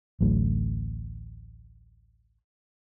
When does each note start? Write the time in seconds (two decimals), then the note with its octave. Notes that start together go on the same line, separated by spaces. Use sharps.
0.21 A1 D2 F#3 A3